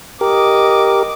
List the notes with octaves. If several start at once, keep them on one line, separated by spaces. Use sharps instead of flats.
G4 A#4 D#5 D6